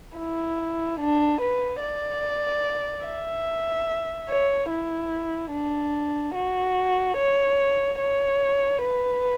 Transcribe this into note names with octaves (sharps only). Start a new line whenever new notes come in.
E4
D4
B4
D5
E5
C#5
E4
D4
F#4
C#5
C#5
B4